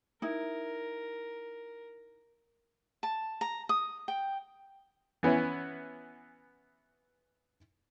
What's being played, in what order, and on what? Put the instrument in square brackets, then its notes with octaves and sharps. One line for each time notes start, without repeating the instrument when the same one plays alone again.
[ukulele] D#4 E4 [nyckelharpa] A#4
[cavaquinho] A5
A#5
D#6
G5
[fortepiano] E3 B3 C#4 E4